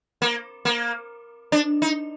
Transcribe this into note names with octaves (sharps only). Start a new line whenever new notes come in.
A#3
A#3
D4
D#4